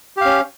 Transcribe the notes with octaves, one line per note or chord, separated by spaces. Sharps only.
C#4 G4 F5